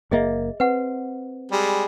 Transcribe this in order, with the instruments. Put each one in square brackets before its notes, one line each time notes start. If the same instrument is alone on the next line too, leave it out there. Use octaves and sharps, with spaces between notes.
[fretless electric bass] F#1 A#3 [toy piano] G#4 D#5 E5
[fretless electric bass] C4 [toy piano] B4 F#5
[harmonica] G3 G#3